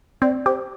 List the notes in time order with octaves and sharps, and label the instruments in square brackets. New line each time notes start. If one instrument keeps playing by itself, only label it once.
[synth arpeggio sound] C4 [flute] D5
[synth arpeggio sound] G4 [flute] C5